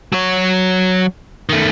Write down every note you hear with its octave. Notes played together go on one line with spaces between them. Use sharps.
F#3 C#5
D#3 A3